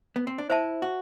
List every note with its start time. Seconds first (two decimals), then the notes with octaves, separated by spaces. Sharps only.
0.16 B3
0.27 C4
0.38 D4
0.50 E4 C5 E5 A5
0.82 F#4